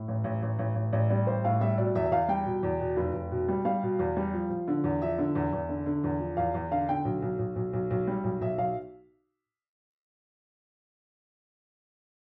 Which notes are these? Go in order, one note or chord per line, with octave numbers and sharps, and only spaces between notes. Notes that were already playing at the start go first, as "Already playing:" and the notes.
Already playing: A2
A1
A1
A1
A1
A1
A1 D5
G3 D5
A1 C5
A2 F5
G3 E5
B2 D5
E2 E5
E5
E2 F5
G3 G5
B2
E2
B2
F1
F1
B2
G3
G3 F5
B2
E2
G3
F3
F3
D3
E2
F3 E5
D3
E2
E2
D3
D3
E2
F3
E2 F5
E2
D3 F5
D3 G5
B1
B1
B1
B1
B1
B1
G3
B1
B1 E5
B1 F5